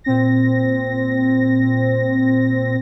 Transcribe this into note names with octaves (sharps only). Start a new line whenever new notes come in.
A#2 C4 A#6